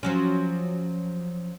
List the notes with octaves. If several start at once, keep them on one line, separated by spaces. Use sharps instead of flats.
F3 F#3 C#4